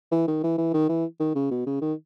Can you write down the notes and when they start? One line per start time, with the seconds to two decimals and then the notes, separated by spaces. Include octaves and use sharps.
0.11 E3
0.27 D#3
0.43 E3
0.58 E3
0.73 D#3
0.89 E3
1.20 D#3
1.35 C#3
1.51 B2
1.66 C#3
1.81 D#3